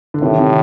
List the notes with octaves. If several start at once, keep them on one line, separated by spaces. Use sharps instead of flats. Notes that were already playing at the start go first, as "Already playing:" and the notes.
D3
A2 C3 D#3
C3 D#3